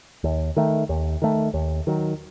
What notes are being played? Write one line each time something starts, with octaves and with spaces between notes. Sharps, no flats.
D#2
D#3 A3
D#2
D#3 A3
D#2
D#3 F#3